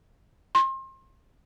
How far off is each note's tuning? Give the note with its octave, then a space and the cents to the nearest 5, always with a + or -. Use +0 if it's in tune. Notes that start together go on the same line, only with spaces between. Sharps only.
C6 +35